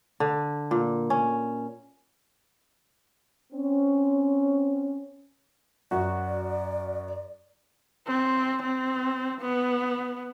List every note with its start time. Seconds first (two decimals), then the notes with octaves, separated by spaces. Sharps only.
0.20 D3
0.71 A#2
1.10 C#4
3.53 C4 C#4
5.91 F#2 F#4 D5
8.07 C4
8.63 C4
9.41 B3